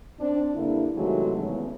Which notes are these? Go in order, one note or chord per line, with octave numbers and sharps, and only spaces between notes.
C4 D4
G2 D3 A#3 D4 E4
C3 D#3 E3 F#3 G#3 A3
E2 C#3